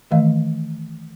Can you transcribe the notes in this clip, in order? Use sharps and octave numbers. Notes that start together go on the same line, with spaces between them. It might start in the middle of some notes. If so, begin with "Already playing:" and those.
D#3 E3 A3 D#5 F5